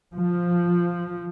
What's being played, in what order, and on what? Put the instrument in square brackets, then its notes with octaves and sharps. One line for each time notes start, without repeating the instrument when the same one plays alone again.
[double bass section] F3